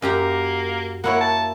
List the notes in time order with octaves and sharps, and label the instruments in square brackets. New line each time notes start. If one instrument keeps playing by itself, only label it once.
[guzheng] F#2 G4 A#5 [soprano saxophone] A#3
[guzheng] A#3 E4 C#5 [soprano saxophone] F#5
[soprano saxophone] A5